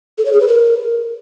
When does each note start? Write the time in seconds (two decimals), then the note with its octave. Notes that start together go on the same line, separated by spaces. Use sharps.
0.18 A4
0.25 C#5
0.33 G#4
0.40 B4
0.48 A#4